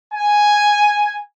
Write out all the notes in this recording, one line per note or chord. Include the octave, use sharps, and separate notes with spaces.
G#5